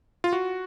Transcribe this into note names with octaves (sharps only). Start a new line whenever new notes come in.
F4
F#4